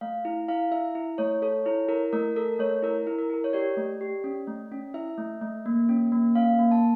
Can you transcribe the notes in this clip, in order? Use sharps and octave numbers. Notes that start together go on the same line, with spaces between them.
A3 F5
E4
E4 F5
E4 E5
E4
A3 C#5
A4 C#5
E4 C#5
E4 A#4
A3 A#4
A4 A#4
A3 C#5
E4 A#4
E4
A#4
E4 A#4
C#5
G4 D5
A3
G4
C#4
A3
C#4
E4 E5
A3
A3
A#3
C#4
A#3
C#4 F5
A#3
A5